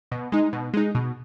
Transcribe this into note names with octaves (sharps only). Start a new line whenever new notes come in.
B2
G#3 D#4
B2
G#3 D#4
B2